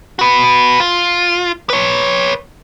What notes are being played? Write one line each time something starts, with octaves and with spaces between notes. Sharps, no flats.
F#4 B4
F4
B4 C#5